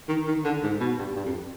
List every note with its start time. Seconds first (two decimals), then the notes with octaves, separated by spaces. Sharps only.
0.08 D#3
0.27 D#3
0.44 D3
0.63 G#2
0.80 B2
0.99 G2
1.16 G2
1.25 F2